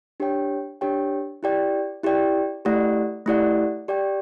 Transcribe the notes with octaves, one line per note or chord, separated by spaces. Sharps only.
D4 G4 C#5 G5
D4 G4 C#5 G5
E4 G4 D5 G5
E4 G4 D5 G5
A3 E4 G4 D5 F#5
A3 E4 G4 D5 F#5
G4 D5 G5